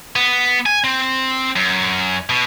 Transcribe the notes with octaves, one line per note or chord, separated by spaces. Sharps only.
B3
G#5
C4
F#2
B2